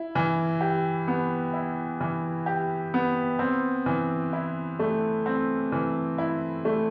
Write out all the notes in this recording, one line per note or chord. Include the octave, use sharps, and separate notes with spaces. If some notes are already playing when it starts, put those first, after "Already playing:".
Already playing: E4
E3
G4
B3
E4
E3
G4
B3
C4
E3
E4
A3
C4
E3
E4
A3